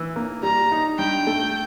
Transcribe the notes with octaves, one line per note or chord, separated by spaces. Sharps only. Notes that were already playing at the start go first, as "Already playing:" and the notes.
Already playing: E3
A#3
G3 A#5
D#4
G2 G5
A3